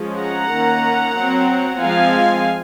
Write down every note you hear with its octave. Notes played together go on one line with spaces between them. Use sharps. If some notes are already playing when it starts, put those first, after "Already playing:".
Already playing: F3 G#3 C#4
F#5 A#5
D#3 A#3 C#4
F#3 C4
F3 G#3 C4 F5 G#5